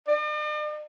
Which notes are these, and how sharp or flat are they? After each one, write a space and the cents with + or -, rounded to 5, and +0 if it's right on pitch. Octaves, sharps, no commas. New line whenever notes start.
D5 +45